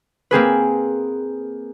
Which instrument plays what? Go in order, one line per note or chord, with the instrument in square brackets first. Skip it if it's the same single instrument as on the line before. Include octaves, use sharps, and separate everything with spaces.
[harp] A#3 C4 G#4 B4